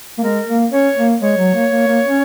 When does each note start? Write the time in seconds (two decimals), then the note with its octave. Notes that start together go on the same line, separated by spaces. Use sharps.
0.18 A#3
0.22 G#3 A#4
0.47 A#3
0.72 C#4 C#5
0.97 A#3
1.22 G#3 C#5
1.38 F#3
1.54 A#3
1.72 A#3
1.87 A#3
2.05 C#4